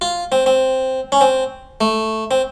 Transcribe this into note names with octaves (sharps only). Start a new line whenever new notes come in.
F4
C4
C4
C#4
C4
A3
C4